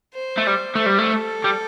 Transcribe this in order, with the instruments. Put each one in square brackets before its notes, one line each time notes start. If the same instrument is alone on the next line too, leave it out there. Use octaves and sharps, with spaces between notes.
[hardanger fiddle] C5
[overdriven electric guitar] A3
G3
[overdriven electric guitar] A3 [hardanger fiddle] C5
[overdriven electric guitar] G3
A3
[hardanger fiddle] A4
[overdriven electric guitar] G3